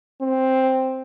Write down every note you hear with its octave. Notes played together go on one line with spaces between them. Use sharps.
C4